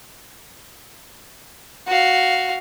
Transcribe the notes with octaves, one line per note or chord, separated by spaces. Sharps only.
F#4 F5